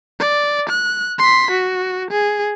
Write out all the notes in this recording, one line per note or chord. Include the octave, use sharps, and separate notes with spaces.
D5
F#6
C6 B6
F#4
G#4